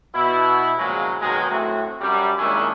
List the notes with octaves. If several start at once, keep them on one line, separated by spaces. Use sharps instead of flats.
B2 E4
A#2 C#3 F3 F#3 G#3
B2 D#3 F#3 G#3
A2 A3 C4 F#4
F#2 G3
A#2 D#3 G#3 C#4 D4 E4